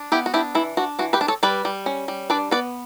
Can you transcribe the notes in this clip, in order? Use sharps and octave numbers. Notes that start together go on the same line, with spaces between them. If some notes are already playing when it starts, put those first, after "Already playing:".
Already playing: D4
B3 E4 G4
F#4
D4 E4 G4
E3 E4
D4 F#4
E3 F#4
G4 B4
D4
A4 C#5
G3 B4 D5
G3
C#4
G3
D4 B4 D5
B3 B4 D5